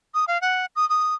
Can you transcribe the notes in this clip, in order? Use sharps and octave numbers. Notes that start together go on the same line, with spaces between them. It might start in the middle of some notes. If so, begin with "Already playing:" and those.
D#6
F5
F#5
D#6
D#6